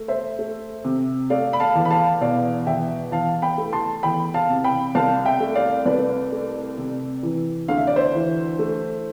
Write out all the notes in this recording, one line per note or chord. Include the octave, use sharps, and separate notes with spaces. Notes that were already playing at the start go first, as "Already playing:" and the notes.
Already playing: A3
C5 E5
A3
C3
A3 D5 F5
B5
F5 A5
E2
B5
F5 A5
B2 D5 F5
E2 E5 G5
E2 F5 A5
G5 B5
A3
A5 C6
E2 G5 B5
F5 A5
C3
G5 B5
C2 F5 A5
E5 G5
A3
D5 F5
C2 B4 D5
A3
C3
E3
D2 F5
E5
D5
C5 E5
E3
A3